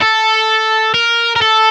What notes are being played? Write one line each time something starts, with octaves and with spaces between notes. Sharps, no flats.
A4
A#4
A#4
A4